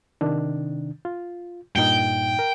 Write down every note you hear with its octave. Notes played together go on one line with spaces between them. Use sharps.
C3 D#3 D4
F4
G2 A#2 D#4 G5
A#4